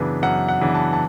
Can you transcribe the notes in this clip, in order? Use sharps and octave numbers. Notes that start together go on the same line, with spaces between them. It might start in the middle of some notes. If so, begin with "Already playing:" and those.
Already playing: F#2 C#3 E3 B3 D4
F#2 F#5
F#5
C#3 E3 B3 D4
A5
A5